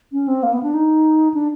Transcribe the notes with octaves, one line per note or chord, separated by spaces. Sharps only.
C#4
C4
A#3
B3
D4
D#4
D4